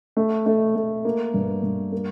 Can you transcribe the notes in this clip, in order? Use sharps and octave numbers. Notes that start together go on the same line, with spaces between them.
A3
A3
A3
A#3
G2
G2
A#3